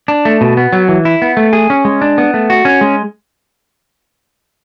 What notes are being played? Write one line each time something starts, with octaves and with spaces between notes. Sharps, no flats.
D4
A3
B2
B3
F#3
E3
E4
B3
A3
G#4
C#4
G#3
D4
B3
A3
F#4
C#4
G#3